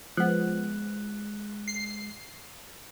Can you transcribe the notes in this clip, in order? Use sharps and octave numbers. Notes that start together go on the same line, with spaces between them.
F3 G#3 B3 F#6
C7